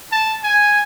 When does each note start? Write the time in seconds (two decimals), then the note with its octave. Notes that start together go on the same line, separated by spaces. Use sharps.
0.12 A5
0.44 G#5